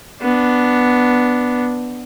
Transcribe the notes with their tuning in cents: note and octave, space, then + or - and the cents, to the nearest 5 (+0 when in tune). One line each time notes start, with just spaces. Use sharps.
B3 +0 D4 +0